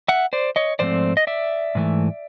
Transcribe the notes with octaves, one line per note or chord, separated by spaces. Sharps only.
E5 F#5
C5 D5
C#5 D#5
G#2 F3 A3 C4 C5 D5
D#5
D5 E5
G#2 E3 A3